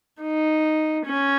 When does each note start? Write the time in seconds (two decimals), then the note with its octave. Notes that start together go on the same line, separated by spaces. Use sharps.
0.22 D#4
1.05 C#4